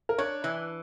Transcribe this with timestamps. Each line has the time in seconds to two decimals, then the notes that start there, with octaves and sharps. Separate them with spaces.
0.09 A#4
0.18 D4 C#5
0.44 E3